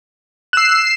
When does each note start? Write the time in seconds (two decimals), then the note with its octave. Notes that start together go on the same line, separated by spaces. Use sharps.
0.53 E6 F#6 C7 E7